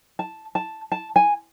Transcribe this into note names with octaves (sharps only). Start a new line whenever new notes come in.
A5
A5
A5
G#5